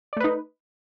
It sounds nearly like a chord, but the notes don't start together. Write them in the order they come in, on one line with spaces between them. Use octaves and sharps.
D5 A3 B4 D#4